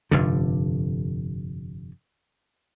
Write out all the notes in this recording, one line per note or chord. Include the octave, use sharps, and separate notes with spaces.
F1 G2 D3